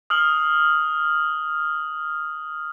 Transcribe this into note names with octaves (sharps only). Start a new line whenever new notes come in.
D#6 F6 F#7